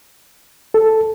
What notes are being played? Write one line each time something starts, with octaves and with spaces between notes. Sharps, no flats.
A4